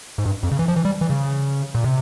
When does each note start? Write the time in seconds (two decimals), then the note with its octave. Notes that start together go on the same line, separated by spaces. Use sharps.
0.18 G#2
0.26 G2
0.43 F2
0.51 C#3
0.59 E3
0.68 F3
0.76 E3
0.85 G3
1.01 E3
1.10 C#3
1.75 A#2
1.84 C3